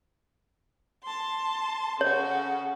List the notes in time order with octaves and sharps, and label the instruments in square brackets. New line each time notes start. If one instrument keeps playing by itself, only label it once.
[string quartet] A5 C6
[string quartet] C#3 F#4 A4 [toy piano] C#5